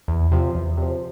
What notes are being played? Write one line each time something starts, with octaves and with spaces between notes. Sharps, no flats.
E2
C3 F3
E2
C3 F3